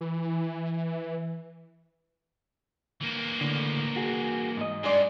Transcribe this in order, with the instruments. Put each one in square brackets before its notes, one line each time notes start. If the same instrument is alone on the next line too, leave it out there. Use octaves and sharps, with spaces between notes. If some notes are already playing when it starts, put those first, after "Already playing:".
[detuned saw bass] E3
[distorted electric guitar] E3 A#3
[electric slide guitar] A2 D3
F#4 G#4
G#2 D#5
[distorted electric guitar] G2 [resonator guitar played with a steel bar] G#3 D5